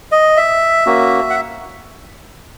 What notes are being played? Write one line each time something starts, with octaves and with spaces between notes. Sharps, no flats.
D#5
E5
A#3 C#4 F#4
F#5